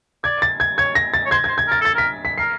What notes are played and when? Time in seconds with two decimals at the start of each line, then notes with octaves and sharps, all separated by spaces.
0.24 D5 G#6
0.42 A6
0.60 G#6
0.78 C#5 G#6
0.95 A#6
1.14 A6
1.26 C#5
1.31 C5 G#6
1.44 C5 G#6
1.58 G#6
1.67 A#4 A6
1.81 A4 A6
1.95 A#4 B6
2.25 B6
2.38 A#4 C7